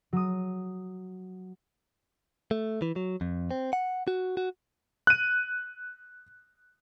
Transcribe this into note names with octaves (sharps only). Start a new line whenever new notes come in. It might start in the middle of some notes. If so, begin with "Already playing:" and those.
F#3 D#6
A3
E3
F#3
F2
C4
F#5
F#4
F#4
F#6 D#7